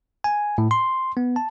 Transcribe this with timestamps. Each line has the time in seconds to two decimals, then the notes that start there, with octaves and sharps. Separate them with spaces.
0.24 G#5
0.58 A2
0.71 C6
1.17 B3
1.36 A5